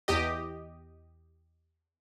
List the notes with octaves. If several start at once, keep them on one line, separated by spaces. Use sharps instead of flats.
E2 G4 D#5